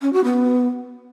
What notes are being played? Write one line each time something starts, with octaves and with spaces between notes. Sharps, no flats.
C#4
F#4
B3